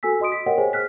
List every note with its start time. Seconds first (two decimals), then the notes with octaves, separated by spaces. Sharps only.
0.03 F#4 A4 G#5 E6 B6
0.20 F#4 D#5 C6 D#6 D7
0.32 B6
0.46 G4 A#4 C#5 D#5 F#5 G5
0.58 G#4 C5 C#5 G#5
0.73 F6 F#6 B6